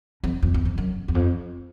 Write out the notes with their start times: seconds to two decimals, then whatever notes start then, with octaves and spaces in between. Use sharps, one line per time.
0.24 F2
0.42 F2
0.54 E2
0.65 F2
0.78 F#2
1.08 E2
1.15 F2